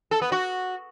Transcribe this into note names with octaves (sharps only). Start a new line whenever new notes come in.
A4
B3
F#4